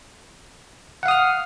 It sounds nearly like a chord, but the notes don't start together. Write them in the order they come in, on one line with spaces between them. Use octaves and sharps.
F#5 F5 D#6 F6